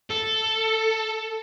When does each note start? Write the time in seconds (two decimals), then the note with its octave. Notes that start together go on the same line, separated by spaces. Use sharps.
0.10 A4